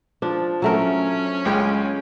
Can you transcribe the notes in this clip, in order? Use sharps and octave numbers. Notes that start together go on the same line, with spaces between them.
F3 D4
F#3 A3 C#4 A#4
C#2 G#3 G5